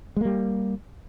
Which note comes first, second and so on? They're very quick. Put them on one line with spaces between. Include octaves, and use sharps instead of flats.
G#3 A#3 G3